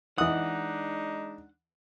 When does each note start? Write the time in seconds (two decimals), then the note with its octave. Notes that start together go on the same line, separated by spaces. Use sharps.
0.18 E3 G#3 D4 D#4 F#5 D#6